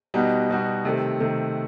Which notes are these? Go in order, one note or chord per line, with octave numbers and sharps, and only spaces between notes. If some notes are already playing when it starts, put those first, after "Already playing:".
B2 G3 D#4 F#4
B2 G3 D#4 F#4
C3 D#3 A3
C3 D#3 A3